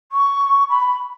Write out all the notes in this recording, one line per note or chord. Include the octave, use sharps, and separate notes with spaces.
C#6
B5